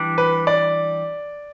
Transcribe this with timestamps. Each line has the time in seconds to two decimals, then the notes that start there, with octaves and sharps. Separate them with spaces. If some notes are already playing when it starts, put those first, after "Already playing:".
Already playing: E3 G3 D4
0.18 B4
0.47 D5